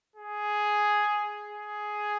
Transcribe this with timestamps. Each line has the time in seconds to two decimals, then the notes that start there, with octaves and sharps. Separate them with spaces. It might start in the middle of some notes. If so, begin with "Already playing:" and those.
0.16 G#4
1.47 G#4